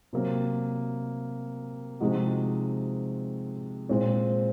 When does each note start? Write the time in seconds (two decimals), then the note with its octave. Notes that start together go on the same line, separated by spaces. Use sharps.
0.13 C3 F#3 A#3
2.00 C3 F3 G#3 D#4 F#4
3.89 A#2 G#3 C4